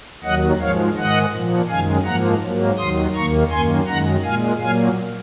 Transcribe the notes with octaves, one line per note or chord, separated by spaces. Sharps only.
D#2 D#3 F#3 D#5 F#5
G#2 F3 G#3 C#5 F5
G#2 D#3 G#3 D#5 F#5
A#2 F3 A#3
F#2 D#3 G#3 F5 G#5
G#2 F3 A#3 F#5 A#5
G#2 F#3 A#3
D#2 D#3 F#3 C6 D#6
D#2 D#3 A#3 A#5 C#6
F#2 D#3 A#3 G#5 C6
F#2 D#3 G#3 F#5 A#5
A#2 G#3 F5 G#5
A#2 F#3 A#3 F5 G#5